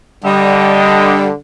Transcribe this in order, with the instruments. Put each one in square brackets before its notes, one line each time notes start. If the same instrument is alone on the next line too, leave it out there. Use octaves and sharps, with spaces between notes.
[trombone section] D3 [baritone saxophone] G3 [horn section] G4 D#5